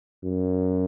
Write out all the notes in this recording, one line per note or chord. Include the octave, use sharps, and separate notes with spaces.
F#2